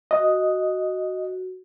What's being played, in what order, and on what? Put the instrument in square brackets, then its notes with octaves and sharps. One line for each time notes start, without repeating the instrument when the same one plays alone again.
[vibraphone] F#4 [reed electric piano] D#5